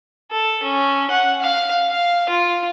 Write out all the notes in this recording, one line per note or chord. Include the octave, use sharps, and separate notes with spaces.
A4
C#4
F#5
F5
F5
F4